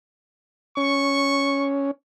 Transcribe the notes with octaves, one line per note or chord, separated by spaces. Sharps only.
C#4 C#6